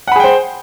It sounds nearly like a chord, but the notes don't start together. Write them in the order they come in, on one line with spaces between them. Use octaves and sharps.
F#5 B5 G#4 G5 C5